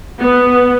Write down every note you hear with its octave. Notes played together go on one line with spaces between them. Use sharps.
B3